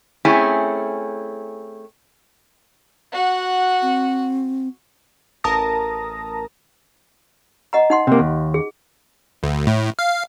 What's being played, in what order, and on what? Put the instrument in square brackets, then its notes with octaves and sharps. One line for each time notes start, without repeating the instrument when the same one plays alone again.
[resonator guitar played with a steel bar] A3 C4 C#4 E4 G#4
[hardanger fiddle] F#4 F#5
[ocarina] C4
[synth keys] A1 A#4 A5 A#5 D#6 A#6
[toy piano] D#5 F#5 A#5
D#4 F#5 C6
[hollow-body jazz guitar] C3 A#3
D#2
[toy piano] G#4
[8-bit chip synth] D2
A2
F5